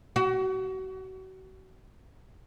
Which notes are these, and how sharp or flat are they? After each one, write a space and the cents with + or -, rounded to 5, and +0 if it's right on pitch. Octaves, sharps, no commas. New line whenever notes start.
F#4 +35